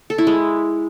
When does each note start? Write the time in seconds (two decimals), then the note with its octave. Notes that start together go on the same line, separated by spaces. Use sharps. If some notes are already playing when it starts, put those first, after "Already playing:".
0.10 A4
0.18 E4
0.27 G#3